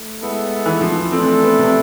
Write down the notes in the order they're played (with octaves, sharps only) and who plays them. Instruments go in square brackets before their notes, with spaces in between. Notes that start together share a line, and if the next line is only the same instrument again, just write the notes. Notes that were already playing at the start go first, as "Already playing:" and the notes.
Already playing: [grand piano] A3
[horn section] G#3 B3 E4 A4
[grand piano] E3
F3
[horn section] E3 A3 D4 A4 [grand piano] C4
[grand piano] C4
B3
C3